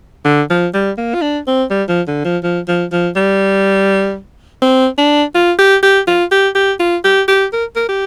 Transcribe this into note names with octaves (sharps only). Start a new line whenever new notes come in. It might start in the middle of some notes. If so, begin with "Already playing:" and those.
D3
F3
G3
A#3
F4
D4
C4
G3
F3
D3
F3
F3
F3
F3
G3
C4
D4
F4
G4
G4
F4
G4
G4
F4
G4
G4
A#4
A#4
G4